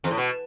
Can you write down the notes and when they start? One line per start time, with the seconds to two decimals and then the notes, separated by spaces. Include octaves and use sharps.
0.04 E2
0.11 A2
0.17 B2